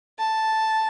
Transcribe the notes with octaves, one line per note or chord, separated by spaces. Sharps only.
A5